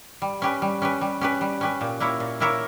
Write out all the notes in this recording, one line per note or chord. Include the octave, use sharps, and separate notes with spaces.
G3
C#4 G4 B4
G3
C#4 G4 B4
G3
C#4 G4 B4
G3
C#4 G4 B4
A#2
A#3 E4 A#4 C#5
A#2
A#3 E4 A#4 C#5